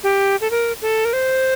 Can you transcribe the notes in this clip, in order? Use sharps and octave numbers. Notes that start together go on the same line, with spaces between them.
G4
A4
A#4
A4
A#4
C5